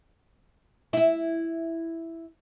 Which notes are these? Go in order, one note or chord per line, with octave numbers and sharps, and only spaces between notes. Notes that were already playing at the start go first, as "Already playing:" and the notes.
E4 E5